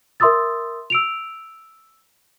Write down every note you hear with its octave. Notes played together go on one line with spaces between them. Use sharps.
A#4 E5 C6 D#6 E6 A6
E6 D7 F7